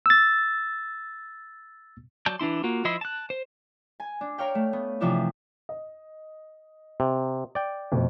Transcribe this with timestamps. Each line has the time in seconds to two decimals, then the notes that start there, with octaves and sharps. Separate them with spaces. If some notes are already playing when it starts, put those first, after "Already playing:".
0.06 E6 A6
2.26 F#3 D5 A5 G6
2.39 E3 D4 E4 C6
2.64 A#3 F4 F#4
2.85 F3 E4 D#5 E5 C6
3.01 A5 F#6
3.30 C5
4.00 G#5
4.21 D4
4.38 A#4 C#5 F5 G5
4.55 A3
4.73 B3
5.01 C3 E3 F3 D4 E4
5.69 D#5
7.00 C3
7.55 D5 G5
7.92 F2 B2 A3